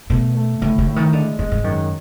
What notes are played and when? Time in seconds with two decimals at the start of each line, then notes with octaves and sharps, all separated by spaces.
0.10 B2 A3
0.35 A3
0.62 A2 D3
0.78 D3
0.87 A2
0.96 D#3
1.13 D3 G#3
1.39 A2 G#3
1.52 G#2
1.64 F#2 D#3